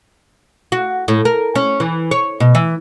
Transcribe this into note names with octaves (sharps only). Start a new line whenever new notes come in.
F#4
A2
A#4
C#4
E3
C#5
B2
E3